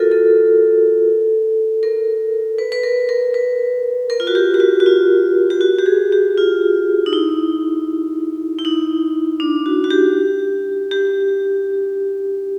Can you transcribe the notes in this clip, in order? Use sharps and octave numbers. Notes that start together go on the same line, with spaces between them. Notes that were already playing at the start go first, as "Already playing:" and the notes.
Already playing: F4 F#4 A4 A#4
A4
A#4
B4
B4
A#4
A#4
B4
A#4
F4
F#4
G4
G4
F#4
F#4
F4
G4
F#4
G4
G#4
G4
F4
D#4
E4
E4
D#4
D4
F#4
F#4
G4
G4